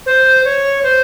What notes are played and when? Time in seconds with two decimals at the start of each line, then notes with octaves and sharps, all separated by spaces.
0.06 C5
0.45 C#5
0.83 C5